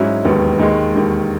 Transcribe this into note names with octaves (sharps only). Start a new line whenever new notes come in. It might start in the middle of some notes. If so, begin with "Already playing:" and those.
Already playing: G#2 F#3 C#4 E4
E1 D#2 D#3 F#3 B3
D#2 D#3 G#3
E1 D#2 D#3